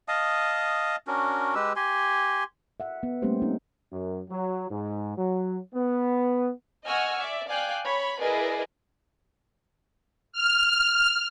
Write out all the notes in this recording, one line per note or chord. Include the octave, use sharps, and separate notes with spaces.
D#5 F5 A5 D#6
C#4 D4 F#4 A#4
G#3 G4 B4 E6
G4 G#5 C6
E5 F#5
B3
G3 A3 A#3 C#4 G4 C5
C4 D#4
F#2
F#3
G#2
F#3
B3
D#5 F#5 G#5 C#6 E6 F6
D5 E5
D5 F5 G5 G#5 F#6
C#5 B5
E4 G#4 A#4 B4 D5 D#5
F6